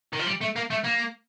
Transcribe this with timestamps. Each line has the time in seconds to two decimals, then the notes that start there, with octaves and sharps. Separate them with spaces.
0.13 D#3
0.19 F3
0.26 G3
0.41 A3
0.56 A#3
0.71 A3
0.84 A#3